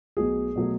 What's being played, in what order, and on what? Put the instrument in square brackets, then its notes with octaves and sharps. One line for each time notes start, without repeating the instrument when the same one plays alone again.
[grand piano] B1 B2 F#3 A3 G#4
B2 F#3 A3